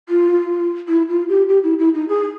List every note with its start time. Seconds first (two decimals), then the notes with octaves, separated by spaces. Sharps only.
0.09 F4
0.88 E4
1.09 F4
1.29 G4
1.48 G4
1.63 E4
1.79 E4
1.94 D#4
2.08 G#4